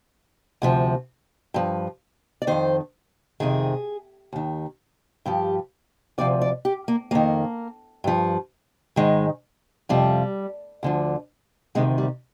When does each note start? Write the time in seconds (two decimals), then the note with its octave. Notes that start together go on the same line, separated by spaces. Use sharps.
0.62 D2 C3 F3
1.54 G2 F3
2.42 D5
2.47 F2 D#3 C5
3.40 F2 C3 D#3 G#4
4.33 D#2 D#3
5.26 G2 F3 G4
6.18 D2 C3 F3 D5
6.42 D5
6.65 G4
6.88 A#3
7.11 F2 D#3 A#3
8.04 G2 F3
8.96 G#2 D#3 G#3
9.89 F2 C3 F3 G3
10.83 D2 D3 F3
11.75 D2 C3 D#3 G#3
11.98 G3